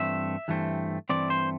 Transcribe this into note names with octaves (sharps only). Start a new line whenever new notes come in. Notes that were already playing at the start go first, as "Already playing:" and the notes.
Already playing: G2 E3 A3 C4 E5
G2 E3 A3 C4
G2 E3 A3 C4 D5
C5